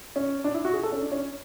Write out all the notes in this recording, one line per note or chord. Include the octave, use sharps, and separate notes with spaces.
C#4
D4
E4
F#4
G#4
A4
C#4
D4
C#4